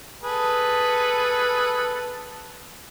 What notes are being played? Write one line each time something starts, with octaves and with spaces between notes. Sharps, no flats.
G#4 A4 B4